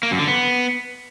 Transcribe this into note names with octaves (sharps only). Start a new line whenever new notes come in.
A#3
F#2
D3
B3